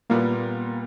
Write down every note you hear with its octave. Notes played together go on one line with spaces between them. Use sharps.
A#2 G3 A#3 B3